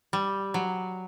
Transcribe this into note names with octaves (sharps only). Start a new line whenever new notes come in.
G3
F#3